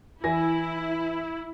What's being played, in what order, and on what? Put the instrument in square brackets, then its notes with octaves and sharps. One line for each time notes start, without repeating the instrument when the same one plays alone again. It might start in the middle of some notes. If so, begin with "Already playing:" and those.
[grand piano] E3 G#5 A#6 [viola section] E4